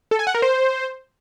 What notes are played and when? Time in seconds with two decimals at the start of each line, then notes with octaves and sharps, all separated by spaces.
0.11 A4
0.19 G#5
0.27 F#5
0.35 A#4
0.42 C5